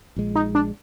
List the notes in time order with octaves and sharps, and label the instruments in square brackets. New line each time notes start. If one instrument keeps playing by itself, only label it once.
[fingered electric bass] A#1 A#2 G#3
[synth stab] D#4
D4